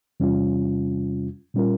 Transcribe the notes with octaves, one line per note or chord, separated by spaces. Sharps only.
E2 C3 G3 C#4 F4
A#2 G3 C#4 F4 A#4